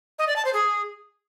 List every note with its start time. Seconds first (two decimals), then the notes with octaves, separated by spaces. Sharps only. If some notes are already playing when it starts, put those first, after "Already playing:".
0.19 D#5
0.27 D5
0.36 A5
0.45 C5
0.54 G#4